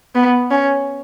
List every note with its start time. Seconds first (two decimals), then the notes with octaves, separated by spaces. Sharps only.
0.15 B3
0.51 C#4